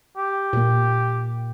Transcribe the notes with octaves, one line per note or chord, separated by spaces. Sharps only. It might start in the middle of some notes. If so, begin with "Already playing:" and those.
G4
A#2 A#3